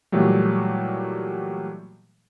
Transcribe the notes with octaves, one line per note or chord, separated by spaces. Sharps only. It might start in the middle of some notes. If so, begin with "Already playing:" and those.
A#2 E3 F#3 G3 A3